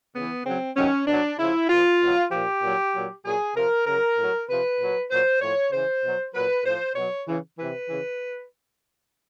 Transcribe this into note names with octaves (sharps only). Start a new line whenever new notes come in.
C#3 E3 B3
C#3 F#3 C4
C3 D#3 F#3 C#4
B2 F#3 D4
C#3 F3 E4
A#2 F3 F4
B2 F#3
A#2 F3 G4
A#2 F#3
A#2 F#3
A#2 F#3 G#4
C3 F3 A#4
C#3 F#3 A#4
A2 F#3
C3 F3 B4
A#2 F#3
A#2 F#3 C5
A2 F3 C#5
C#3 E3 C5
B2 F#3
A#2 F#3 B4
A2 F3 C5
B2 F#3 C#5
C#3 E3
C3 E3 B4
C#3 E3